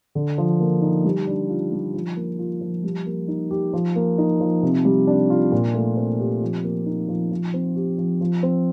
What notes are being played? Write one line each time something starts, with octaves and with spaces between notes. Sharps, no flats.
D3
F3
A#3
D#4
G3
D4
F4
G3
F3
A#3
F4
F3
G3
A#3
D#4
G4
F3
A#3
D#4
F3
C3
G3
D4
F4
A#2
A3
C4
G4
F3
A#3
D#4
F3
F3
C4
G4
F3
F3
C4